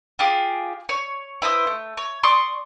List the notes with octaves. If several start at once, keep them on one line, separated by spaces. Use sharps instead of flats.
F4 G4 G#4
C#5
E4 B4 C5 D#6
A3
C#5
D5 C6 C#6 D#6